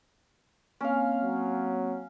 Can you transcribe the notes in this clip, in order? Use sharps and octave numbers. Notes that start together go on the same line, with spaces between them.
A#3 C4 C#4 C#5 F5
F#3